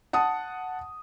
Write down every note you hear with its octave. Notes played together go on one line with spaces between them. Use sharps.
F#5 A5 D#6